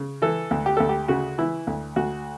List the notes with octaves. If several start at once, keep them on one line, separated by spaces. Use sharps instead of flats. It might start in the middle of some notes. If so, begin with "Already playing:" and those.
Already playing: C#3
E3 A4
D2
G4
D2 A4
G4
C#3 F#4
E3 E4
D2
D2 F#4